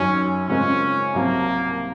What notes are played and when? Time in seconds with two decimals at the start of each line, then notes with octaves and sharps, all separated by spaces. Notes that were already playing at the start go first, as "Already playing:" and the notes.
Already playing: F#2 D#3 F#3 C#4
0.49 C#3 G#3 C4 C#4 F4 A#4
1.15 C2 C3 F#3 A#3